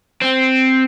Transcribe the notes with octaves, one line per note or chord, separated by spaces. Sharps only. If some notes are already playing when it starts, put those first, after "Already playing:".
C4